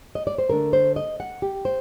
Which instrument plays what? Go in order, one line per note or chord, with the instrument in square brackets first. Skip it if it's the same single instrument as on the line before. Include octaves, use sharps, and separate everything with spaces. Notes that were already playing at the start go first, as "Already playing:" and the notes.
[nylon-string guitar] D#5
D5
C5
D3 A3 D4 A#4
C5
D#5
F#5
G4
C5